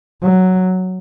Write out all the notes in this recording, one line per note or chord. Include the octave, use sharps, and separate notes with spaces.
F#3